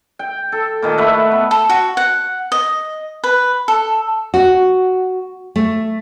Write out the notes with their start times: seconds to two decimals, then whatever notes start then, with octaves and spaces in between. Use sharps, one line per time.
0.19 G5
0.52 A4
0.82 A#2 D#3 D#5 A5
0.98 A3 B4 E5 F#5
1.32 B3
1.51 A4
1.69 F#4
1.97 F#5
2.52 D#5
3.24 B4
3.68 A4
4.34 F#4
5.56 A3